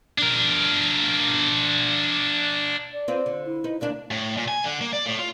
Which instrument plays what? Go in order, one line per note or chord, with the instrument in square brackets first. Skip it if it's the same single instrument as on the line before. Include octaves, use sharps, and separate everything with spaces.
[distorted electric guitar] D4 A#4
[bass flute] D5
[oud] C4 F4 B4
D3
[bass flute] E4
[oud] D#4 B4
[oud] D2 A#3 D4 [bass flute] D5
[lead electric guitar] A2
A#2
G#5
D3
A#3
D5
A2
F4